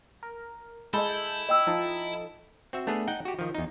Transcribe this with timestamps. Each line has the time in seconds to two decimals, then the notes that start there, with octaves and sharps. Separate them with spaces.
0.23 A#4
0.94 G#3 E4 A4 D#5 B5 G6
1.49 D#5 G5 E6
1.67 F3 D#4 A4
2.73 C4 F#4 E5
2.87 A3 B3 D4 G#4
3.08 D#4 F#5 G5
3.25 F#4 G4
3.39 D#3 F3
3.55 E2 D#4